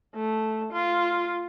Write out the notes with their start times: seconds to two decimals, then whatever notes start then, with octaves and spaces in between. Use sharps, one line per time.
0.15 A3
0.73 F4